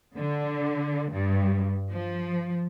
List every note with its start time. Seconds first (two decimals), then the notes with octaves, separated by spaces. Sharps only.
0.17 D3
1.11 G2
1.91 F3